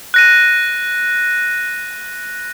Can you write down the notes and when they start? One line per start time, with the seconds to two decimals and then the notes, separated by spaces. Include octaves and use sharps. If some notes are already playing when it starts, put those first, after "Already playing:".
0.14 F#6 A#6 D#7